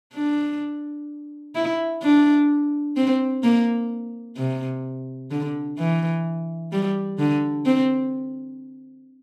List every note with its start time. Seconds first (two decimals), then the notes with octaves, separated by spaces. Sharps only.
0.14 D4
1.55 E4
2.03 D4
2.97 C4
3.43 A#3
4.37 C3
5.31 D3
5.79 E3
6.72 G3
7.19 D3
7.66 C4